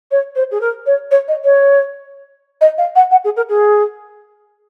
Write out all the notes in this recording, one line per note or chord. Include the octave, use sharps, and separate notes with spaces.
C#5
C5
G#4
A#4
C#5
C#5
D#5
C#5
D#5
F5
F#5
F#5
G#4
A#4
G#4